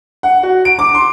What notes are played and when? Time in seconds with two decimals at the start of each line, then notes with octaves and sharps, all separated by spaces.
0.23 F#5
0.43 F#4
0.65 D7
0.79 D6
0.95 C6